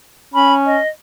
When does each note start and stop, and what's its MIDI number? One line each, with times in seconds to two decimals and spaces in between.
0.34 0.77 61
0.34 0.54 83
0.66 0.88 75